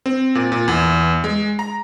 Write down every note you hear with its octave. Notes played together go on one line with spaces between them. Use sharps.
C4
A#2
A#2
E2
G#3
A#5